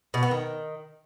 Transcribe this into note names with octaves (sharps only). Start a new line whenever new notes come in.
B2
B3
D#3